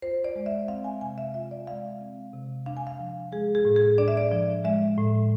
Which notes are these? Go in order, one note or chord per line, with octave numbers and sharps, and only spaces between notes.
F4 C5
D5
G#3
E5
C4 F5
G#5
C3 G#5
E5
F4 E5
D5
G#3 F5
C4
C3
D4 F5
G#5
F5
F3
G#3 G#4
G#4
A2
G#4
D4 D5
E5
D5
F3
G#3 E5
A2